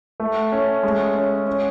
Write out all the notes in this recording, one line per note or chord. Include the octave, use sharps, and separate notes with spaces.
A3
C#4
G#3
C#4
C#4